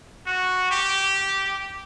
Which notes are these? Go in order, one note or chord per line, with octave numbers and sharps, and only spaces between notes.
F#4
G4